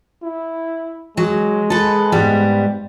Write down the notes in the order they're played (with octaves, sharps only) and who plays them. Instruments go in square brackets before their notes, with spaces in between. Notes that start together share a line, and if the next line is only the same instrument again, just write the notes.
[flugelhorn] E4
[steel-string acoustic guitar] F#3 [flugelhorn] G#3
[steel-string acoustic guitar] A4 B4
G#2 G3 B3